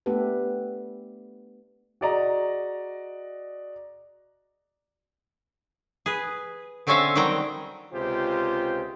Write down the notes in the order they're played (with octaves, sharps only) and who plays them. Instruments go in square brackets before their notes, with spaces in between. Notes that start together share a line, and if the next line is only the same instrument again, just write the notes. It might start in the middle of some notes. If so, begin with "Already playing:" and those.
[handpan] A3 B3 D4 G4 A4 B4
[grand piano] F#4 G#4 D5 D#5 A#5
[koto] G#4 B4
D3 C4 C#4 C#5 E5 F5
D#3 F#3 G3 C4 G5 A#5
[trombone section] C#2 C3 F4 G4 G#4 C5